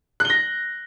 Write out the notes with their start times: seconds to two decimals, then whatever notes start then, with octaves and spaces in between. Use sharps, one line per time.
0.20 F#6
0.25 G7
0.30 A#6